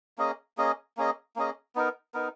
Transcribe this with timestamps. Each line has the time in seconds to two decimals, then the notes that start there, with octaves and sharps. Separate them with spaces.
0.18 A#3 C#4 G#4 D#5
0.57 A#3 C#4 G#4 D#5
0.97 A#3 C#4 G#4 D#5
1.36 A#3 C#4 G#4 D#5
1.75 B3 D#4 A#4
2.14 B3 D#4 A#4